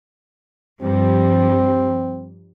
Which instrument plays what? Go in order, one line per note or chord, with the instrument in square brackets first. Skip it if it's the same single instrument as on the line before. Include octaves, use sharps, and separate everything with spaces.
[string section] G2 F3 G3 [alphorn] C4